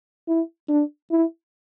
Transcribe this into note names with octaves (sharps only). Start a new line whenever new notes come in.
E4
D4
E4